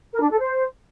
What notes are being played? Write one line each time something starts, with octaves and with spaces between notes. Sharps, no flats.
A#4
D4
A4
C5